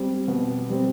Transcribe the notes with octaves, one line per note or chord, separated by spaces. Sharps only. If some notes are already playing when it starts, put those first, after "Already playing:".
Already playing: G3 C4
B2
G3 C4